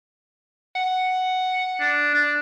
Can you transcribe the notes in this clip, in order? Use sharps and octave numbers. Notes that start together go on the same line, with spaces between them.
F#5
D4
D4